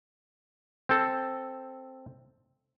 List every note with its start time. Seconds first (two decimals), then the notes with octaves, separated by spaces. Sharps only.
0.89 C4 A4